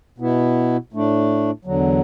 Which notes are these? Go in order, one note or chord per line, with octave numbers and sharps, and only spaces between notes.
B2 B3 E4
A2 A3 D4
E2 D3 F#3